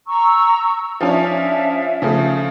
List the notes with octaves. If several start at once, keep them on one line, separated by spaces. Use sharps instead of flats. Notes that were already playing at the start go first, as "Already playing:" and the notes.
A#5 C#6 E6
F3 C#4 D4 E5
C#3 F3 A3